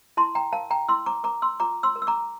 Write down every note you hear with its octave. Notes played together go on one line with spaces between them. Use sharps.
E4 A5 C6
G5 A#5
A#4 F5 A5
G5 A#5
E4 C6 E6
A#5 D6
A#4 A#5 D6
C6 E6
F4 A#5 D6
C6 E6
A#4
E6
A#5 D6